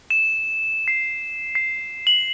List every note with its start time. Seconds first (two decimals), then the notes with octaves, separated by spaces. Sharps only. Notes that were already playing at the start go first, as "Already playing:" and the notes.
0.10 E7
0.88 C7
1.55 C7
2.07 F#7